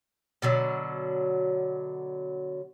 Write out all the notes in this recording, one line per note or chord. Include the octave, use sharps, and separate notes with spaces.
B2 D3 F#3